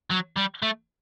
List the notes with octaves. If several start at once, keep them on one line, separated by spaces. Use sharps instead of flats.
F#3
G3
A3